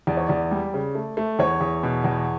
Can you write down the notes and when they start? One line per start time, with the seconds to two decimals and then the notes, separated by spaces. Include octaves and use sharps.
0.07 E2 D5
0.17 C#5
0.27 E2 D5
0.51 G3
0.74 C#3
0.95 A3
1.17 A3
1.39 E2 C#5
1.61 E2
1.83 B2
2.04 E2